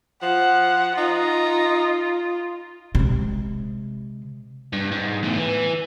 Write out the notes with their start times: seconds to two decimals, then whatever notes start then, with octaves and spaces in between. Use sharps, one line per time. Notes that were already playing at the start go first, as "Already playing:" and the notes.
0.22 F3 F#5
0.98 D#4 F4
2.95 C3 G#3
4.73 G2
4.92 G#2
5.23 E2 A2
5.37 E3